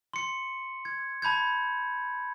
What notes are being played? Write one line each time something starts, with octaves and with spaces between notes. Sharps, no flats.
C6 C#7
G#6
A5 B5 G6 G#6